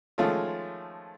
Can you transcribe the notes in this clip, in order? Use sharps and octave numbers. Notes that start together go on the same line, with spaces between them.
D#3 F3 G#3 A3 C#4 F4